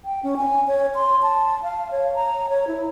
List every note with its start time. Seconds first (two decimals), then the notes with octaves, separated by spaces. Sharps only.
0.05 G5
0.23 C#4
0.37 G#5
0.68 C#5
0.95 C6
1.23 A5
1.63 F5
1.91 C#5
2.16 A#5
2.49 C#5
2.68 E4